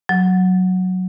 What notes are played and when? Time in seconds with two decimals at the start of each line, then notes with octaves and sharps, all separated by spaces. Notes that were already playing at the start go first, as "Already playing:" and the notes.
0.09 F#3